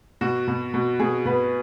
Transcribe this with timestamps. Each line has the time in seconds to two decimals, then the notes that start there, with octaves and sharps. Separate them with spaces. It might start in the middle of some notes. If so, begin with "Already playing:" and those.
0.21 B2 F#4
0.48 B2
0.74 B2
1.00 B2 G#4
1.25 B2 B4